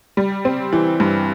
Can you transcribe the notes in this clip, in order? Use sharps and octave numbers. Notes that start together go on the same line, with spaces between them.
G3
C4
E3
G2